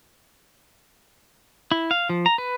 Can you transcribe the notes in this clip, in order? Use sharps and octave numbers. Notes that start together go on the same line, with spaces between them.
E4
F5
F3
A#5
B4